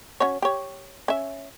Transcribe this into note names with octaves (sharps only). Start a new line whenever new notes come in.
C#4 F#4 C#5
G4 C#5
C#4 E5